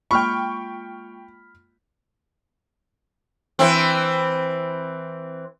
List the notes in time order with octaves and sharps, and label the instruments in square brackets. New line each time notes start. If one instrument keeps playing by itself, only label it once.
[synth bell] G#3 A#3 F4 [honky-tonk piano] G5 C#6 [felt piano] B5 F6
[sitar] E3 C4